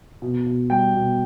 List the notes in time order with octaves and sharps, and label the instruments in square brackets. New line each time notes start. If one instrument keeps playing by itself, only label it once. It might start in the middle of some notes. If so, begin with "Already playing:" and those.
[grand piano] B2
B2
G3 G5
B2